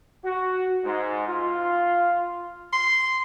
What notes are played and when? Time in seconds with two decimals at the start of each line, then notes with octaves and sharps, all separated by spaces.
0.24 F#4
0.84 G#2
1.27 F4
2.73 C6